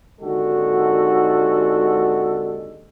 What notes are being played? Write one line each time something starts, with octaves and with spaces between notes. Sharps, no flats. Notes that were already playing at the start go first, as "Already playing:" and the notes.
G#1 D#2 D3 G#3 F#4 A4